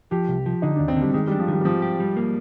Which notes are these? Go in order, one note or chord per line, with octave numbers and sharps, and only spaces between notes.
F3 G4
C2
F3
D3 D#4
D4
D#2
C4
D3
G3
D#3 G#3
G3
D4
F3
D#3 G3
G3
F3 C4
G4
G3
A#3